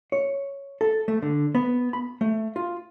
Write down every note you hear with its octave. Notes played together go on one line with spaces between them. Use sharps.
C#5
A4
A3
D3
B3
B5
A3
F4